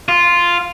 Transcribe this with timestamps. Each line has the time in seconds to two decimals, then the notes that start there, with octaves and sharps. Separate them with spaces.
0.09 F4